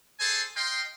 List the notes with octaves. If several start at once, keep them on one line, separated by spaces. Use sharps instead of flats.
G#4 A4 C5 G#5 A5
D#5 F5 G5 C6